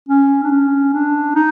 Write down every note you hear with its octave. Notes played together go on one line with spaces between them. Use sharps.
C#4
D4
C#4
D4
D#4